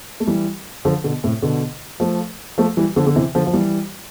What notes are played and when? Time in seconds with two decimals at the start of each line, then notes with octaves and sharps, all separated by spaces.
0.20 A3
0.27 E3 G3
0.85 D3 F3
1.04 B2 D3
1.24 A2 C3
1.42 B2 D3
2.00 F3 A3
2.58 F3 A3
2.77 E3 G3
2.96 D3 F3
3.07 D3
3.16 C3 E3
3.35 D3 F3
3.47 F3
3.53 E3 G3